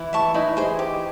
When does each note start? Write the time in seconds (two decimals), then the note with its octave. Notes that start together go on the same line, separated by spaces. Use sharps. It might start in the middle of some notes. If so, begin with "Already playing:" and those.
Already playing: E3 E4
0.13 E5 A5 C#6
0.34 E3 D#4 E4
0.57 G#4 C5
0.79 G4